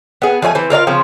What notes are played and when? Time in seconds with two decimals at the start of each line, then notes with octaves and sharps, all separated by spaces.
0.22 B3 G#4
0.42 F3 A3 C5 G#5
0.55 E3 C4
0.70 F4 A#4 D5 F5
0.87 C#3 F3 C4